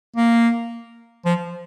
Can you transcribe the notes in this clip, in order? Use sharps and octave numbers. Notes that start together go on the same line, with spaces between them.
A#3
F3